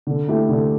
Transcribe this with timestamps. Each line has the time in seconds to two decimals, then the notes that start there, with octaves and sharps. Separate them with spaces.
0.07 D3
0.28 A3 E4 G4
0.49 D3